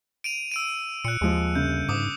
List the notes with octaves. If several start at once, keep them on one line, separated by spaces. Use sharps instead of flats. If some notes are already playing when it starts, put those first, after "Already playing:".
D7 D#7 F7
E6 D7 D#7
A#2 F#6 C#7
D#2 F3 G#3
G1 C#3 G6
G#2 D6 D#6